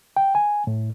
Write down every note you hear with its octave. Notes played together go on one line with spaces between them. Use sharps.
G5
G#5
A2